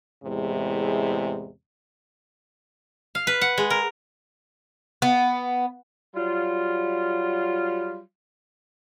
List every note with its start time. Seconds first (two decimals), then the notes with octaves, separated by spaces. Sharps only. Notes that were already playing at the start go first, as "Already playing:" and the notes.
0.24 E2 A2 C3 G#3
3.15 F5
3.27 B4
3.41 F#5
3.58 G#3
3.70 A#4
5.02 B3
6.15 F#3 G3 F4